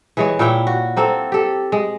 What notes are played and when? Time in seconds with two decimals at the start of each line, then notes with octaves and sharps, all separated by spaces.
0.17 E3 G#3 C#5
0.39 A#2 E4 C#5 G5
0.67 F#4
0.97 A#3 C4 A4
1.32 G4 A4
1.72 G#3